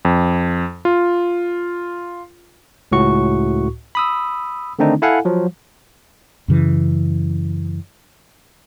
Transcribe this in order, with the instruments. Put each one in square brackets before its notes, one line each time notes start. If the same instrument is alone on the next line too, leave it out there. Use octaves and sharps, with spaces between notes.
[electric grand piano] F2
F4
[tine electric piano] C#2 A2 F#4 C#6
B5 D#6 E6
D3 D#3 A3 C4 D4 D#4
E4 A4 F5 F#5 G#5
F3 F#3
[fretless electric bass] F#2 C#3 E3